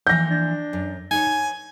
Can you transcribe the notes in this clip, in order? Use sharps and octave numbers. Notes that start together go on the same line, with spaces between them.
E3 F3 A#3 G6 A#6
D4
F#2
D#4 B4 C#5 G#5